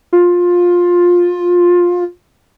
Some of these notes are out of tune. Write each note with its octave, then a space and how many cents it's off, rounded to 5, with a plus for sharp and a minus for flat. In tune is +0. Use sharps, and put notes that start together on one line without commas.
F4 +15